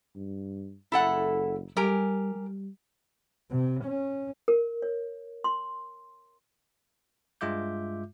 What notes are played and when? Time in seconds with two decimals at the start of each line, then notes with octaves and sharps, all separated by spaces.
0.15 G2
0.92 F#1 E4 A4 F#5
1.77 G3 G4 A#4 G#5
2.35 G3
3.50 C3
3.84 C#4
4.48 A#4
4.82 C#5
5.44 C6
7.41 G2 G#3 F4 E5 D6 G6